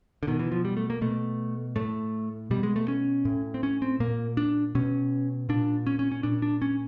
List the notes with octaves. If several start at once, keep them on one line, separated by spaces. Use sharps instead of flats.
D3
B2 D#3
E3
F3
G3
A3
A#3
B2 A3
A2 A3
B2 G3
G#3
A3
C#4
A2
C4
C#4
C4
A#2 A#3
D4
B2 C#4
A#2 D4
C#4
C#4
C#4
A#2 D4
D4
C#4